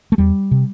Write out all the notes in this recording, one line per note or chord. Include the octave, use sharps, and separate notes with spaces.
A3
E2 G3
C3